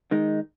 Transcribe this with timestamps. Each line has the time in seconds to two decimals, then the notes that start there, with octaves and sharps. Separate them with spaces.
0.11 D#3 G#3 D#4